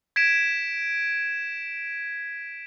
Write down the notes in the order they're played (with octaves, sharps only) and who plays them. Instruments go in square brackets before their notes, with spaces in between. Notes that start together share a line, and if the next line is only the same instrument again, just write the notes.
[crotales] G#6 B6 D7 E7